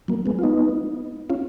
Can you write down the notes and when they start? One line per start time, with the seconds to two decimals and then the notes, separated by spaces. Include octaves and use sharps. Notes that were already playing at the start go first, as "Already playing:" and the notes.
0.08 F#3 A#3
0.26 G#3 B3
0.39 F4
0.43 B3 D#4
1.30 C#4 F4